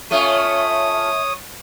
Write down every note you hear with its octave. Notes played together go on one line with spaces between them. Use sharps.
A3 C#4 F4 C#5 E5 D#6